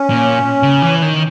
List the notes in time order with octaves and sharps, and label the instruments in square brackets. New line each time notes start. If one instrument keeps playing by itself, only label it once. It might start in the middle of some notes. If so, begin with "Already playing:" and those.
Already playing: [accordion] C#4
[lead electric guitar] A#2
C#3
E3
D#3